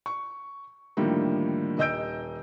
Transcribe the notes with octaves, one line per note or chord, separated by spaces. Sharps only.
C#6
A2 D3 D#3 F3 G3 A#3
D#1 D#5 E6 G6 D7